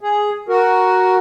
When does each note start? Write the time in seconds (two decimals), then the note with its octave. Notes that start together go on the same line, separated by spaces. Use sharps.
0.01 G#4
0.49 F#4 A#4